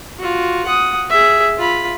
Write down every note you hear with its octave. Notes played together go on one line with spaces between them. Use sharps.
F4 F#4
F#5 D#6
G#4 E5
F4 B5